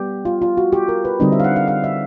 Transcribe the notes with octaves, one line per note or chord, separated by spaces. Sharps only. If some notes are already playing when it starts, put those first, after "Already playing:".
Already playing: G3 B3 G4
F4
F4
F#4
G4
A#4
B4
D3 G3 C4 D#4 D#5
E5
F5
F#5
F5
F5
E5